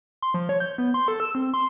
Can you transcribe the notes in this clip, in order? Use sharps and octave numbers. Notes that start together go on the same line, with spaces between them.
C6
F3
C#5
G6
B3
C6
A4
E6
C4
C6